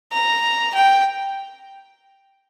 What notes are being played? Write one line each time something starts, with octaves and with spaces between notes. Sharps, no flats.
A#5
G5